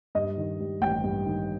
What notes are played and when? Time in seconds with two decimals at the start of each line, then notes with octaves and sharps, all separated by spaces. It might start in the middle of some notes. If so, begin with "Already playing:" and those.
0.15 G2 D#5
0.37 D#3
0.60 G3
0.81 A1 G5
1.04 G2
1.26 D#3